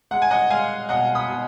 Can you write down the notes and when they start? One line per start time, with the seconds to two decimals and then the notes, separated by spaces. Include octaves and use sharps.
0.11 G#3 F#5
0.22 G#5
0.31 D#5 F#5
0.50 G#3 F5 G#5
0.89 B2 D#5 F#5
1.15 B5 D#6
1.28 B2